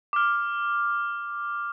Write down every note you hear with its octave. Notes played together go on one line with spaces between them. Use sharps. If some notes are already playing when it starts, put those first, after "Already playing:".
D6 F6